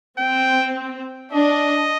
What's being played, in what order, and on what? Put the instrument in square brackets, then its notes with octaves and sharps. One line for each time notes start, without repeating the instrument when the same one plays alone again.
[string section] C4 [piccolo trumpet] G5
[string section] D4 [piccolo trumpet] D#5